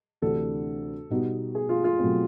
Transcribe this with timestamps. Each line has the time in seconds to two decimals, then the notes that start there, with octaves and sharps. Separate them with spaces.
0.22 D2 C3 E3 A3 D4 A4
1.10 B2 G3 B3 D#4 F#4
1.55 G#4
1.69 F4
1.84 F4
1.99 B2 F#3 A3 C4